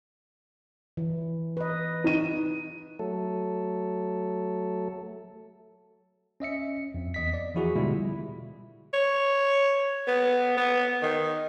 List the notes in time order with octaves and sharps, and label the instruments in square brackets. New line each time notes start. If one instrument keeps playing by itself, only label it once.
[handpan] E3
B4 D#5
[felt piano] D#4 D#7
[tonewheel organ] F#3 A3 A4
[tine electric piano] C#4 D#5 E5 C#7
F2
E2 D#5 B6
D5
E3 F3 E4 F#4 G#4
B2 D3 G3 G#3 E4 F4
[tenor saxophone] C#5
B3
B3
D#3